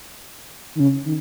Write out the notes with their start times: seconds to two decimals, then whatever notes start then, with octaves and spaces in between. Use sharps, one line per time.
0.75 D#3
0.80 C#3
1.06 D#3